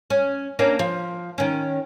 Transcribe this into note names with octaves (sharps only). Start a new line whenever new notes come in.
C#4
A#3 C#4 D4
F3
D#3 C#4